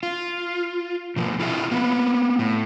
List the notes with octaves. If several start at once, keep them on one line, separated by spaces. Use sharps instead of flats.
F4
B2 F3
E4 F4 G#4 E5
A#3 B3
A2